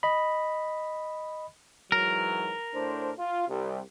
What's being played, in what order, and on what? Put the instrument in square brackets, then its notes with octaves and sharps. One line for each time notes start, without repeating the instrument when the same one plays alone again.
[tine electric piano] D#5 B5
[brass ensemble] G#2 E3 F#3 [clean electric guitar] A#4
[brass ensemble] A2 D4 C5
F4
C2